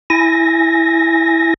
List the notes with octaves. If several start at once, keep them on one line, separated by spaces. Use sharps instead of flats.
E4 G#5 A#6